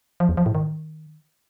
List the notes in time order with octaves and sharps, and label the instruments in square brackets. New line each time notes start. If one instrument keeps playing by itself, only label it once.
[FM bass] F3
E2
F3
A2
D#3